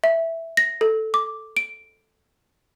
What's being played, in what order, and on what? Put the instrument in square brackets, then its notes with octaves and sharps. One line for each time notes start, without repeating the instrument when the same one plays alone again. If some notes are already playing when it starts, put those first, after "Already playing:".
[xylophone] E5
A#6
A4
D6
D7